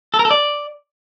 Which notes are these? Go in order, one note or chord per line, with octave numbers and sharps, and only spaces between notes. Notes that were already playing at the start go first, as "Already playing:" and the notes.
A4
A#4
A4
D5